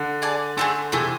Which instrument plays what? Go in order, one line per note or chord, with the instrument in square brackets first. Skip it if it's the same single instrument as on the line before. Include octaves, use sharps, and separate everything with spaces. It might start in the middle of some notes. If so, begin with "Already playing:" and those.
Already playing: [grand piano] D3
[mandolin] G#4 D5 A5
[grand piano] D3 [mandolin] A3 C4 G#4
[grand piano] C3 E3 [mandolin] A3 C4 G#4